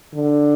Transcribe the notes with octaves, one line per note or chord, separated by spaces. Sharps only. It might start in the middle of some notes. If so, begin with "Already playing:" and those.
D3